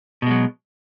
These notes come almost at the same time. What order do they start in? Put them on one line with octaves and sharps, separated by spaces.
B2 G#3 F#3